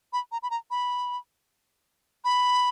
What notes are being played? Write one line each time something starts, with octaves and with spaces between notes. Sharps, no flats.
B5
A#5
B5
A#5
B5
B5